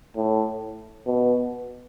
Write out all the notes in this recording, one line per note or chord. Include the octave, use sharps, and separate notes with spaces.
A2
B2